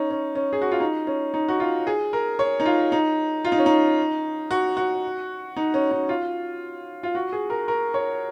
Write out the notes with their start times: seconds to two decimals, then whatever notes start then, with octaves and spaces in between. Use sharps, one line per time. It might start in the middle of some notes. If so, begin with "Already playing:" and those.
Already playing: C#4 D#4
0.10 C#4
0.35 C#4
0.53 G#4
0.62 F#4
0.71 F4
0.80 D#4
1.07 C#4
1.34 D#4
1.48 F#4
1.60 F4
1.87 G#4
2.13 A#4
2.39 C#5
2.60 D#4
2.66 F4
2.92 D#4
3.45 F4
3.52 D#4
3.58 C#4
3.66 D#4
4.51 F#4
4.77 F#4
5.57 D#4
5.74 C#4
5.91 D#4
6.09 F4
7.03 F4
7.15 F#4
7.32 G#4
7.50 A#4
7.68 A#4
7.94 C#5